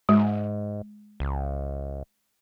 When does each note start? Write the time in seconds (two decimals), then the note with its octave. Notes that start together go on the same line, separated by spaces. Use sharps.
0.09 G#2 G#3
1.20 C#2